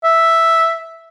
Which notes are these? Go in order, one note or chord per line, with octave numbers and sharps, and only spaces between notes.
E5